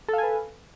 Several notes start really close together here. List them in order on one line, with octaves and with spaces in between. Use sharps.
A4 F5 G#5 B4